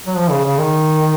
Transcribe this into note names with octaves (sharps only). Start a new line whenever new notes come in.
F#3
F3
C#3
C#3
D#3